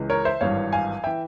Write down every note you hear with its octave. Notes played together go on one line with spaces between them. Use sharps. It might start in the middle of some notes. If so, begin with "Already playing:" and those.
Already playing: C#2 C#3 E3
A#4 C#5
C5 E5
G#1 G2 E3 C#5 F5
F5 G#5
E3 E5 G5